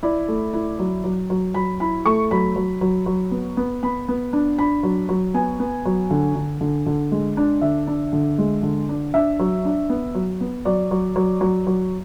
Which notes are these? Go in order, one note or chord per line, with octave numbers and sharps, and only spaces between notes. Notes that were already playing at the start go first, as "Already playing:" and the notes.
E4 D5
A3
E4
F#3
F#3
F#3
F#3 B5
E4 B5
A3 C#6
F#3 B5
F#3
F#3
F#3
B3
B3
B3 B5
B3
D4
D4 B5
F#3
F#3
B3 G#5
B3
F#3
D3
D3
D3
D3
G#3
D4
D3 E5
D4
D3
G#3
D3
D4
D4 E5
F#3
D4
B3
F#3
B3
F#3 D5
F#3
F#3
F#3
F#3